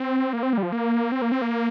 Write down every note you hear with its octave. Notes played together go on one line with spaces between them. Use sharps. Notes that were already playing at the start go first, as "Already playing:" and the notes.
Already playing: C4
A#3
C4
A#3
G3
F3
A#3
C4
A#3
C4
A#3